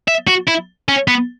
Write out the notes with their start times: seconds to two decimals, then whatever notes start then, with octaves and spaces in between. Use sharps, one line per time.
0.08 E5
0.28 F#4
0.48 E4
0.89 C#4
1.08 B3